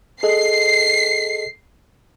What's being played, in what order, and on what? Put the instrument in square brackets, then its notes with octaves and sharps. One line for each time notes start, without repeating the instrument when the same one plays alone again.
[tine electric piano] G#4 A4 D#5 [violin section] C7